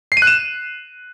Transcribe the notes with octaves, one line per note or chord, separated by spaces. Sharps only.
C7
D#7
F#6
E7